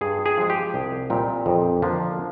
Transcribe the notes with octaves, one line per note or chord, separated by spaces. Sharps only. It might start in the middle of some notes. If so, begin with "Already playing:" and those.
G2 G#4
G#4
F3 G#3
G4
C2
A#2 G3 C4 D#4
F2
D3 F3 A#3 D4